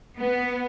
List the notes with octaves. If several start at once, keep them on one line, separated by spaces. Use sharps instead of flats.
B3